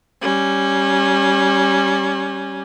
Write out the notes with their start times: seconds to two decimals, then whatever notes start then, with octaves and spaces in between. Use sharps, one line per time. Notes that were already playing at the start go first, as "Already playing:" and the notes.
0.22 G3 C#4